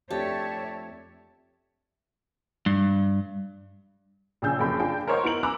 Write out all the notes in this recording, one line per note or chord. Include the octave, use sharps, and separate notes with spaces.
F2 A3 D4 G4 C#5 D5 E5 A5
G2
A#1 C#3 G#4 E6 G6
F#1 F2 G5 B5
D4 F4 G#4 G5 A5
A#4 C5 C#5 D#5 F#5
B3 E4 A#4 D7 F#7
G#5 A#5 B5 D6 E6 F#6